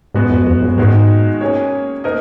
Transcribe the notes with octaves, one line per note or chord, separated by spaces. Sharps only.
G#2 G#3 B3 F#4
F#2
F2
F#2
G#2 D#3 G#3 D#4 F#4
A#3 C#4 G#4 C#5
A#3 D#4 A#4 D#5